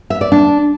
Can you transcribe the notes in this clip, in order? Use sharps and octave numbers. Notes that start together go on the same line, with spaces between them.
E5
D5
D4